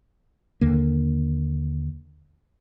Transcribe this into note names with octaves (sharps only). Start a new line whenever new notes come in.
D#2 D3 A#3